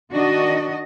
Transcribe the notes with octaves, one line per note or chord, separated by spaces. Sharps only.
D#3 D4 F#4 D#5